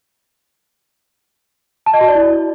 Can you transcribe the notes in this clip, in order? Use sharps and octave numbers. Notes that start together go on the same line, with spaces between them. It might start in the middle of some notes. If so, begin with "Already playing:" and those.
A5
D#5
F#4
D5
E4